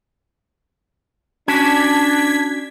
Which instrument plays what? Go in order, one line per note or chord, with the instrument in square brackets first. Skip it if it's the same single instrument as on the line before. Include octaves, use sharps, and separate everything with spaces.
[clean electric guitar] C#4 F#4 A5 [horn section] D4 [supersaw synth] G#6 B6